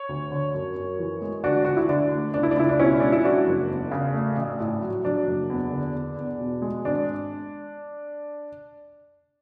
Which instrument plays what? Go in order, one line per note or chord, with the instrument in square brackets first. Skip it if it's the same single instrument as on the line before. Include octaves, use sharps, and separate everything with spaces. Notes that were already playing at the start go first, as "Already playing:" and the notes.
Already playing: [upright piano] C#5
D2
D3
F#2
F#2
E3
G#3
D2 D4 F#4
D2 F#4
E4
D3 D4
A3
C#2 D4
E4
D4
C#2 E4
D4
B2 C#4 E4
G#3 D4
E4
F#3 D4 F#4
F#1
E2
C#3
A3
A1
A2
F#3
F#3 D4
F#1
E2
D3
E2
E2
B2
G#3
G#1 D4